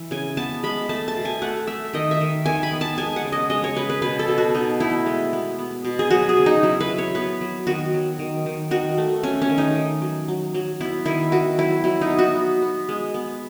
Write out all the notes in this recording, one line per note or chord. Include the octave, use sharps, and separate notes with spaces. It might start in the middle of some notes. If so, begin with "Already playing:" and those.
Already playing: E3
C#3 G#5
B3 A5
G#3 B5
A3 A5
A5
B2
G#5
A3 F#5
A3 E5
D#3 D#5
E5
D#3
D#3 G#5
B5
B3
A5
G#3 G#5
F#5
C#3
D#5
G#3 D#5
C#5
C#3 B4
B4
B2 B4
A4
B2
F#4
B2 D#4
A3 E4
G#3
B3
B3
B2
G#4
F#3 F#4
G#4
C#3
D#4
F#3 E4
B4
F#3
C#5
B3 B4
F#3
D#3 F#4
F#3
D#3
D#3
D#3 F#4
A3
A3 C#4
C#4
D#3
D#4
D#3
F#3
F#3
F#3
B3 E4
D#3 E4
D#3 F#4
F#3 E4
F#3 E4
D#4
B3
F#4
B3
B3
G#3
B3